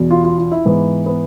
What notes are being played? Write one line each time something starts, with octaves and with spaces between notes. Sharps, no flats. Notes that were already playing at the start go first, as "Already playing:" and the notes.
Already playing: E2 B2
F4
F4
F4
E4
G#2 E3 B3
B3